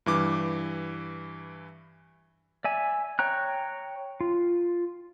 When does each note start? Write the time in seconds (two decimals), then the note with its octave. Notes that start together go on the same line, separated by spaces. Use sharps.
0.06 G2 E3 D6
2.64 D5 E5 G#5
3.19 C#5 G5 A#5 F#6
4.21 F4